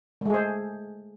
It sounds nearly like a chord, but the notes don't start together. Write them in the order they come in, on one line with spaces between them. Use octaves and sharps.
A3 G#3 G#4 C5